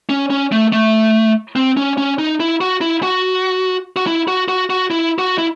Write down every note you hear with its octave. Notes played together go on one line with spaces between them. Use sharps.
C#4
C#4
A3
A3
C4
C#4
C#4
D#4
E4
F#4
E4
F#4
F#4
E4
F#4
F#4
F#4
E4
F#4
E4